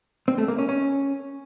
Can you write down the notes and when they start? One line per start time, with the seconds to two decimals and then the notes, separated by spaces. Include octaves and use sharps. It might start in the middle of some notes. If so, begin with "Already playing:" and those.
0.28 C4
0.38 A3
0.48 A#3
0.58 C#4
0.69 C#4